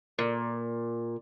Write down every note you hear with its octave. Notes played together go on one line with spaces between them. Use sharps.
A#2